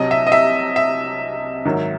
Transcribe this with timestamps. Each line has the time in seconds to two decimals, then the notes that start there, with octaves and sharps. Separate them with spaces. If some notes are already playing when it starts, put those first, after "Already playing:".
Already playing: C2 C3 F#3 D#5
0.11 E5
0.27 D#5
0.32 E5
0.76 E5
1.65 G#2 D#3 F#3